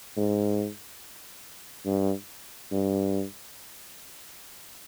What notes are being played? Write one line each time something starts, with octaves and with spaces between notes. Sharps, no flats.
G#2
G2
G2